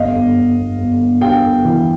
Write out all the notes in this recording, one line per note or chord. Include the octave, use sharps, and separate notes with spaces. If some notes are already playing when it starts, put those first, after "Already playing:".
Already playing: G1 D#5 F5
G1
G1
G1
G1
G1
G2 F5 G5
G1
E3